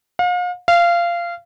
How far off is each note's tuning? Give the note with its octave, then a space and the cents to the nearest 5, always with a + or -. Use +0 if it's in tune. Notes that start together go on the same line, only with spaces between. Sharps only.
F5 +40
F5 -20